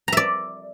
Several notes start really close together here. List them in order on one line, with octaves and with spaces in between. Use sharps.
A#5 E5 D5